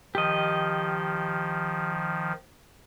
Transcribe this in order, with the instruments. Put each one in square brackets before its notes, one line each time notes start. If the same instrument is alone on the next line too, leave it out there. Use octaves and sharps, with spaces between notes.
[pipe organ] D#3 F3 [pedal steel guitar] G4 D#5